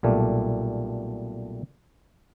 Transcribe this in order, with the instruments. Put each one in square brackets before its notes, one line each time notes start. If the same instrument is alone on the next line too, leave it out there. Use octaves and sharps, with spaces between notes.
[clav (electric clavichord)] B1 A#2 G3 A3